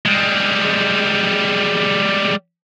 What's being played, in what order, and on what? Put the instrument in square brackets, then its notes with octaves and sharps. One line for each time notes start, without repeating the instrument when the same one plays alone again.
[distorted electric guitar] G3 G#3